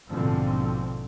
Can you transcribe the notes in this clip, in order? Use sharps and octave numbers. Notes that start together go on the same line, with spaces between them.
A#1 G#2 B2 D3 F3 C4